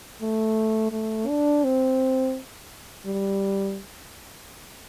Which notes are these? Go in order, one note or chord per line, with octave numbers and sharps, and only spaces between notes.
A3
A3
D4
C4
G3